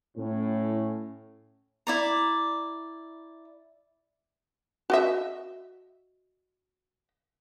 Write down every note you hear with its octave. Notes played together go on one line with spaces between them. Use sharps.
A2 C#4
E4 D5 A#5
F#4 D#5 E5